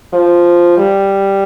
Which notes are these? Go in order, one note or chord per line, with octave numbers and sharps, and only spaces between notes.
F3
G3